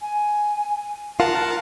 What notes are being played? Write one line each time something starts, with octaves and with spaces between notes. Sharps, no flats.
G#5
F4 A#4 F#5 A5